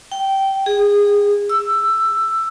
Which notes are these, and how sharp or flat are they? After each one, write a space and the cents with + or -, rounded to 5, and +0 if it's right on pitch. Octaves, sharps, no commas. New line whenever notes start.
G5 -15
G#4 -20
E6 +10